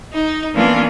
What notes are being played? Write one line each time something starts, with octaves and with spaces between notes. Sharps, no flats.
D#4
E3 A#3 B3 C#4 D4 F4